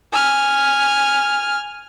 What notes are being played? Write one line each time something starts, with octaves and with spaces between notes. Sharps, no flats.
G#5 F6